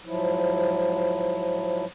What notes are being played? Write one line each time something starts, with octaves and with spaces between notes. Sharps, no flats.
G#2 F3 F#3 E4